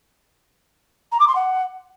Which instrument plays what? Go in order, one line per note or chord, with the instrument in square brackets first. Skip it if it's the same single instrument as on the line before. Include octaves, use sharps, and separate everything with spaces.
[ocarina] A#5
D6
C6
F#5